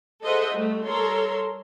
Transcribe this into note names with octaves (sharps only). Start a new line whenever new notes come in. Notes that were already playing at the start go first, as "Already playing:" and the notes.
G#4 A4 C5 D#5 E5 F#5
G3 A3
G3 A4 A#4 C#5 A#5 C6